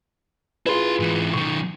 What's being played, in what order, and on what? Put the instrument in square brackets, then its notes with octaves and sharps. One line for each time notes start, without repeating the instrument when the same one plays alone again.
[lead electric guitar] E4 C6 [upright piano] F4 G#4 B4
[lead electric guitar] G#2 E3
[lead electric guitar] B1 D#3 [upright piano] C#6